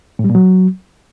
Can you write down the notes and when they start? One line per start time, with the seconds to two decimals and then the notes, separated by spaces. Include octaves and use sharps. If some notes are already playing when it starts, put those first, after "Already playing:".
0.19 A2
0.24 G3
0.30 A#2
0.35 F#3